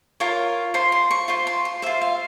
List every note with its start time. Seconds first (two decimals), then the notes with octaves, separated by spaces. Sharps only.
0.20 F4 A#4 C#5
0.74 F4 C5 C6
0.92 C6
1.11 C#6
1.28 F4 C5 C6
1.47 C6
1.65 C6
1.82 F4 C5 E5
2.01 F5